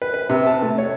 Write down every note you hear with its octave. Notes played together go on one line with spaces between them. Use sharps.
B4
B4
C3
A5
A3
C#5